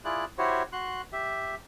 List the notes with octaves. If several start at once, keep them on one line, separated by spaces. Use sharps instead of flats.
E4 F4 G#4 D5 F#6
E4 F#4 G4 C5 C#5
F#4 C6 F#6
G4 E5